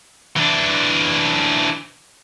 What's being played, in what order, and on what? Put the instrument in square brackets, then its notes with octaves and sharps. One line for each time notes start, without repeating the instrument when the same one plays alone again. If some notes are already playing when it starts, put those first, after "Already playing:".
[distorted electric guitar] E3 D4